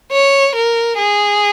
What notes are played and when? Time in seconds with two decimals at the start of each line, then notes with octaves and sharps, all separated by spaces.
0.12 C#5
0.55 A#4
0.98 G#4